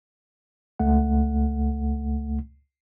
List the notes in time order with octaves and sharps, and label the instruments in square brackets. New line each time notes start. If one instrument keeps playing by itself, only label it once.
[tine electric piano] C#2 A3 F#5